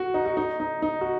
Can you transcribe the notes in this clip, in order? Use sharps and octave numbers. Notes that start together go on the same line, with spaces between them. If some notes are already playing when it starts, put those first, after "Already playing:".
Already playing: F#4
D#4
F#4
D#4
D#4
D#4
F#4